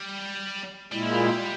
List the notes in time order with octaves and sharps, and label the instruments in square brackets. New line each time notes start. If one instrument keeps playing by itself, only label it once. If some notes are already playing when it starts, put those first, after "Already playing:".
Already playing: [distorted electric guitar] G3
[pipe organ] A#2 G#3 E4 [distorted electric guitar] G3
[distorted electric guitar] F3
G3